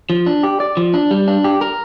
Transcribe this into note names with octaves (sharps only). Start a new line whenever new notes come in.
F3
D4
G4
D5
F3
D4
G3
D4
G4
A#4